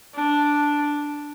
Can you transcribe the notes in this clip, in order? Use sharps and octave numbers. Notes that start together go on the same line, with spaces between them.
D4